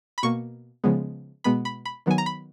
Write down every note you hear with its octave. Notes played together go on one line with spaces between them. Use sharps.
B5
B2 A#3 C#6
C#3 F3 G#3 B3
B2 G#3 B3 B5
B5
B5
D#3 F#3 B3 G#5
A#5
B5